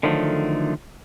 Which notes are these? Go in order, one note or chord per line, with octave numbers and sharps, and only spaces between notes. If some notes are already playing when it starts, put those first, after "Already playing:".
D3 D#3 F3 F#3 A3